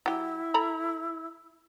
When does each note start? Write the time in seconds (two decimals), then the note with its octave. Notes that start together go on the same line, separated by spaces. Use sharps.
0.06 F#3 E4 G4
0.54 A4 A#5 B5